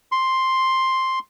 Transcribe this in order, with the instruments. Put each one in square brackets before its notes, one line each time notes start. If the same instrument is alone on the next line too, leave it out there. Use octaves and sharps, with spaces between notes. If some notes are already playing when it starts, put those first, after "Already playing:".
[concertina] C6